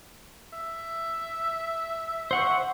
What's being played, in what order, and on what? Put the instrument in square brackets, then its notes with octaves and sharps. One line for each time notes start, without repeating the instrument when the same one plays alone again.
[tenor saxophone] E5
[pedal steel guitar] C5 F#5 C#6